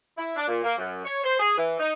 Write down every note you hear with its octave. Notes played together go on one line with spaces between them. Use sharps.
E4
D4
A#2
A#3
F#2
C#5
C5
G#4
E3
D#4